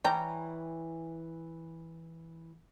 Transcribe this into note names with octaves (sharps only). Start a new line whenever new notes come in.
E3 G3 C#5 G5 A#5